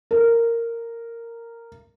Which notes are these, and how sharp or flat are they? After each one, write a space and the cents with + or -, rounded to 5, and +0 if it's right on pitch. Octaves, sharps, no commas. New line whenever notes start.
A#4 -10